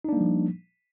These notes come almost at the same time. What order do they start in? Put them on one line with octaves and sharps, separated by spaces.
D#4 D4 A#3 G3 F3